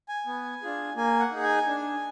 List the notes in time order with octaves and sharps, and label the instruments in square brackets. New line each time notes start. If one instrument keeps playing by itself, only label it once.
[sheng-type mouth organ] G#5
B3
D4 F4 G#4
A#3 G#5
F#5
D#4 G#4
G#5
D4